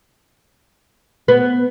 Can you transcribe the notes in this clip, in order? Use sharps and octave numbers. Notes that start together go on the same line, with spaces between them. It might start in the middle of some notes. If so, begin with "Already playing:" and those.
B3